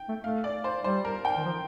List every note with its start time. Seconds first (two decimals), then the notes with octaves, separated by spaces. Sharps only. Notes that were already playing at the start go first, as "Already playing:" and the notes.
Already playing: G5
0.09 A3
0.23 A3 F5
0.44 D5
0.64 C5
0.84 G3 C5
1.05 A#4
1.25 G5
1.37 D#3
1.45 F3